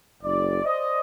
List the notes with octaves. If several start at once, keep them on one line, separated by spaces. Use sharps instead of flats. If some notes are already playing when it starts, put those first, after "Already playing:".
F#1 D5
C5 D5 D#5